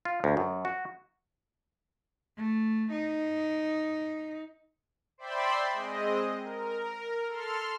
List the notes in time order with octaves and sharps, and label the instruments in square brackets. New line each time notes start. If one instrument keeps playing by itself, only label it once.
[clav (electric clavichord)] F4
D2
F#2
F#4
[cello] A3
D#4
[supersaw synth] C5 D5 E5 G5 B5 C6
G#3 C4 D#5
A#4
A4 C6 F6